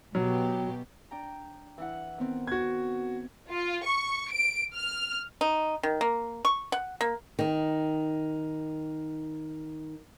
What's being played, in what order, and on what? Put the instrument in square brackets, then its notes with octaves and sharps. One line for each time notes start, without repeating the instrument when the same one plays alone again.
[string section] B2 G4 [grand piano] F#3
[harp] D4 G5 A#5
E3 E4 F#5
D#3 B3 C4
[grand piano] F#4 G#6
[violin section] F4
C#6
D7
F6
[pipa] D#4
D#3
A#3
C#6
F#5
A#3
[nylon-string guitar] D#3 D#4